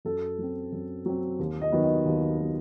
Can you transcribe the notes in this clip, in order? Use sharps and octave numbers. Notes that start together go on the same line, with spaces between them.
F#2 A4
F#3 C4
F#2
F#3 C4
D#2
D#5
D#3 F#3 B3
D#5
D#2
D#3 F#3 B3